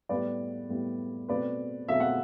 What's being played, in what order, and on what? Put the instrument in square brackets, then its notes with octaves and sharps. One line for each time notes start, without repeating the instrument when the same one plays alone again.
[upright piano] A2 G3 B3 B4 D5
A2 G3 B3
B2 A3 C4 B4 D5
B2 A3 C4 E5
F#5